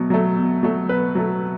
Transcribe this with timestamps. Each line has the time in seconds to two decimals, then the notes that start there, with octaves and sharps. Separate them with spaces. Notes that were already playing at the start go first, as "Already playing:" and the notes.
Already playing: B2 F#3 A3
0.10 F#3 A3
0.37 B2
0.63 F#3 A3
0.89 B2 B4
1.15 F#3 A3